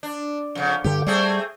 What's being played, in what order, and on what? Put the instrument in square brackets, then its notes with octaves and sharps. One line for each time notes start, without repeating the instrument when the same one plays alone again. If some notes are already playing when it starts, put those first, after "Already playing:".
[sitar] D4
F2 C#3
[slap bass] G2 D3 [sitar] G4
[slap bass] G3 [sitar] A3 C4 G#4